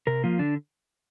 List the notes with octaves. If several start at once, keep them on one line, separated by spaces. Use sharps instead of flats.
C3 A#4
F3 A#3 F4
D3 D4